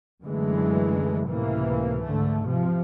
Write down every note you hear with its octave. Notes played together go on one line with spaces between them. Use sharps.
F#2 D3 E3 G#3 A3
C#2 A2 C3 E3 A#3
G#2 D3 A3
C3 F3